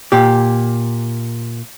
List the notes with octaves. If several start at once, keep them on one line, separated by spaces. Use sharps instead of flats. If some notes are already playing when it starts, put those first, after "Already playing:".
A#2 G4